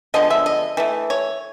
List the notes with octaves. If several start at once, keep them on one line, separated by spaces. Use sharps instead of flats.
D3 F3 G#3 B3 D#5
E5
D#5
E3 A3
C#5